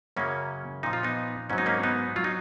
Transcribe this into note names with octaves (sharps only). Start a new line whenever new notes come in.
F#2 C#3 F#3 A#3 C#4
A#2 F3 D#4
F4
B3 D#4
G#2 F#3 C#4
D#4
A#3 C#4
B3 D#4
F#3 F4
D#4